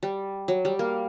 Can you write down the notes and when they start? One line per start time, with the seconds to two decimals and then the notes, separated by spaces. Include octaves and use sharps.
0.03 G3
0.48 F#3
0.65 G3
0.79 A#3